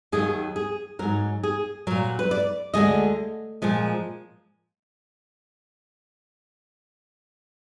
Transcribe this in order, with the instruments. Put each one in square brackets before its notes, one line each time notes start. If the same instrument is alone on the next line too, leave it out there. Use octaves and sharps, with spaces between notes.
[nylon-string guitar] D#2 D#3 F#3 G#4
G#4
G#2 F#3 A#4
G#4
A#2 F#3 A#4
B4
D5
D2 D3 F3 G#3 D#5
A#2 F3 G#3